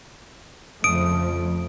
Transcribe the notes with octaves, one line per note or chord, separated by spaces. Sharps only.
F2 C#3 F3 A3 D#6 D7